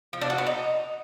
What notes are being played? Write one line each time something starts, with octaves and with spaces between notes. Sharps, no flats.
F3
D4
F#4
B3
D#4